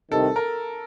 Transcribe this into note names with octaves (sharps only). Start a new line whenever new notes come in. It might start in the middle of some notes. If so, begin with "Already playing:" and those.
C2 C3 D#3 A4
A#4